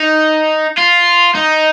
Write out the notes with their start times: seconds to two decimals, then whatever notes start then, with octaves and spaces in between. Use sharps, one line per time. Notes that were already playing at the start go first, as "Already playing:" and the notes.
Already playing: D#4
0.78 F4
1.35 D#4